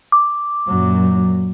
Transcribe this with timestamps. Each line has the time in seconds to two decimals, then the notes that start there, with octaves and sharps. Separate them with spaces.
0.12 D6
0.68 F#2 A#2 F#3